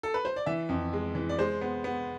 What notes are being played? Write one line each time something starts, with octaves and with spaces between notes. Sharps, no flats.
A4
B4
C5
D5
E3 E5
F2
G#3
E3
D5
G#3 C5
B3
B3